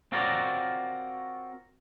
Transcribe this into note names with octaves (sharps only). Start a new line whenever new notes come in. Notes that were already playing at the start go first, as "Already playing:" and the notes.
C4 F4 F#4 A#4 C#5 D5